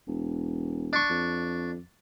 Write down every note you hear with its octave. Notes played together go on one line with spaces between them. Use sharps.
E1
D4 C#6
F2